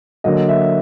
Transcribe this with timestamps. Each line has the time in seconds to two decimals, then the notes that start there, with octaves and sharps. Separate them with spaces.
0.24 D3 F#3 A#3 D#5
0.49 E5